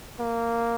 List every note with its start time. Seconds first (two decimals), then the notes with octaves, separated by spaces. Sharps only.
0.19 A#3